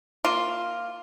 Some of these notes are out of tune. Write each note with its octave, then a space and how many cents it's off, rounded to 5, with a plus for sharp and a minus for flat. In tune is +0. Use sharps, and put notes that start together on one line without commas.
A#3 +0 F4 +0